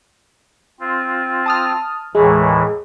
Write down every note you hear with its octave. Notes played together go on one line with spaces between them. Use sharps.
C4 F4
A5 D#6 F6
D#2 A2 E3 G#3